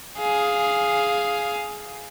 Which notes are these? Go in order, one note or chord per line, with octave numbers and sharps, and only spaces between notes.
G#4 F5